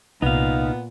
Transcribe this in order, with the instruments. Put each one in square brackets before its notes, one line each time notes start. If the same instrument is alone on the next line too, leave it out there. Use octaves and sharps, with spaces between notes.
[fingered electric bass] C2 [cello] A#2 [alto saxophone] B3 [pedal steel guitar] D#4 F5